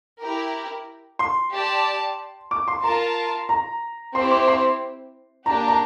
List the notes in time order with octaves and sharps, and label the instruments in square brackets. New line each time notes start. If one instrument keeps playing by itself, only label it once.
[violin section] E4 G4 A#4
[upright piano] C6
[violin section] G4 D5 A5
[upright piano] D6
C6
[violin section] F4 A#4 F5 A5 [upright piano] A#5
[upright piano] A#5
[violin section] C4 E4 G4 C5 [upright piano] C6
[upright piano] D6
C6
[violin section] A#3 D4 G4 [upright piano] A#5
[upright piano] A#5